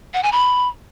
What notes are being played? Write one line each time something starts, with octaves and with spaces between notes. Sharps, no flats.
F#5
G#5
B5